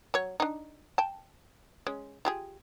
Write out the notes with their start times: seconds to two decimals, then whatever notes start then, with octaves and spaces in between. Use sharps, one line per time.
0.14 F#3 C#5
0.40 D4 D#4
0.98 G5 A5
1.87 G#3 C#4
2.25 F4 G4 G#4